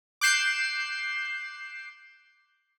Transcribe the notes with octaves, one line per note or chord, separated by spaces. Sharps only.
D6 F#6 G6 C7 E7